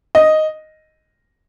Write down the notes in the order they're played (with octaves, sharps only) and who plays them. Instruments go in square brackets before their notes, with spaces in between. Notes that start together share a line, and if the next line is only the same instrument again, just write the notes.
[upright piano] D#5